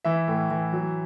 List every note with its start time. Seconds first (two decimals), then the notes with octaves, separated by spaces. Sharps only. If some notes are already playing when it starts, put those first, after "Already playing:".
0.05 E3 E5
0.28 A2
0.51 E3
0.73 F#3